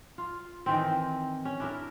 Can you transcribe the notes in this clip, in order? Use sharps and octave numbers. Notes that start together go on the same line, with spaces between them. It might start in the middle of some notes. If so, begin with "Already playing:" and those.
F4
D#3 E3 C4
C#4
D4 E4 A#4